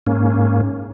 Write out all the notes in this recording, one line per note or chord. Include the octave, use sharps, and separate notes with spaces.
G#2 A#3 C#4